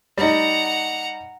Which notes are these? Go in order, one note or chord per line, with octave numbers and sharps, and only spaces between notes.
G3 D#4 F#5 A#5